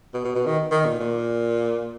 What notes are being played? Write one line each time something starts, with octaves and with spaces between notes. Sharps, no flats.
B2
B2
B2
D#3
D#3
A#2
A#2